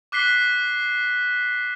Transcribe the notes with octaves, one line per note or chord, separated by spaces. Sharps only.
D6 F#6 B6 C7 G7